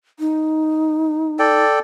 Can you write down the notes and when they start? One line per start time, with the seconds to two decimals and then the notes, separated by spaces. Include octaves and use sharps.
0.20 D#4
1.39 A4 D5 G5